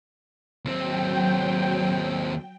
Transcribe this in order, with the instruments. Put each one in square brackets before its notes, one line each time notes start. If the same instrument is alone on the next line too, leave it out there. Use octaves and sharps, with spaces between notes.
[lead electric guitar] D#2 C4 [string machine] F#3 G5